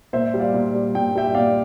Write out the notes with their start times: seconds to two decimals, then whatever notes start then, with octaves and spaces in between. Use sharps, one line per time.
0.13 A#2 C5 E5
0.34 G3
0.40 D5 F5
0.54 A#2
0.75 G3
0.95 A#2 G5
1.15 G3 E5 G5
1.35 A#2 D5 F5